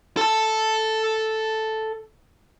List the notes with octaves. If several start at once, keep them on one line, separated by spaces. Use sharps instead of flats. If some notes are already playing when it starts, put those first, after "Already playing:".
A4 A5